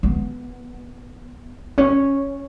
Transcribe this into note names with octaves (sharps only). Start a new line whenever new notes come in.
B3
C#4